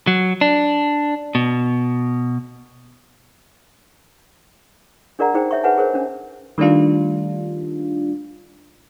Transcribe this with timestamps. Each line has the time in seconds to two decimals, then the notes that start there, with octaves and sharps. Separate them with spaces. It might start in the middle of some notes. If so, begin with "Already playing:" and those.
0.07 F#3
0.41 D4
1.35 B2
5.19 D4 G#4 A#4 D5 F#5 A#5
5.34 D#4 G#4 C5 G5
5.51 C#5 E5 C#6
5.64 G#4 B4 C#5 F#5 G#5 A5
5.78 G#4 A#4 C5 C#5
5.93 C#4 D4
6.58 D#3 G3 A3 D4 F4